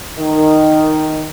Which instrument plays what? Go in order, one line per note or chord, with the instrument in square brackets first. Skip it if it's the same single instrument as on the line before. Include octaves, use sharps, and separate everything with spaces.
[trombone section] D#3